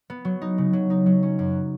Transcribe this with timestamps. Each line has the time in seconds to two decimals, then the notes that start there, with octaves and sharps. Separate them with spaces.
0.10 B3
0.25 F#3
0.42 D#4
0.58 C#3
0.73 F#3
0.90 D#4
1.06 F#3
1.23 C#4
1.39 F#2